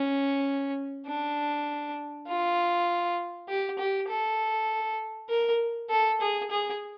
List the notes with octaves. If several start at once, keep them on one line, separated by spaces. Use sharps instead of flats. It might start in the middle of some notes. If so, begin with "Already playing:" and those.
Already playing: C#4
D4
F4
G4
G4
A4
A#4
A4
G#4
G#4